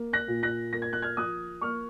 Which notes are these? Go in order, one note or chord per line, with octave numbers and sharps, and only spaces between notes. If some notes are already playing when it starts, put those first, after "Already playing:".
Already playing: A#3
F#6 A#6
A#2
F#6 A#6
A#3 A#6
G#6
F#6
F6 G#6
F3 D#6 F#6
A#3 C#6 F6